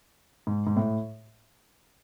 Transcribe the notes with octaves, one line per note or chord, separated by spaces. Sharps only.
G#2
G#2
A2